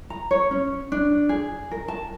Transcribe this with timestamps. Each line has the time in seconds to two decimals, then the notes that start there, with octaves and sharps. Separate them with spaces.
0.10 A#5
0.31 C#5
0.51 C#4
0.92 D4
1.29 G#4
1.71 A#4
1.88 A5